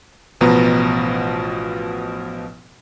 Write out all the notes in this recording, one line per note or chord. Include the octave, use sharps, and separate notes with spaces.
A1 B2 F3 B3 A#5